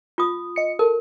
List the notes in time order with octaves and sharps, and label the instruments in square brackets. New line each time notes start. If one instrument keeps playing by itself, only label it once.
[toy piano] F4 D#6
[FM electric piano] D#5 C#7
[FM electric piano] A4 [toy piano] A#4